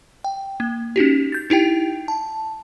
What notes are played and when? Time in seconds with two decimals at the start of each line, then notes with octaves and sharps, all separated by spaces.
0.24 G5
0.60 A#3
0.96 C#4 D#4 F#4 G4
1.32 G6 A6
1.50 D#4 E4 G4 G5
2.08 A5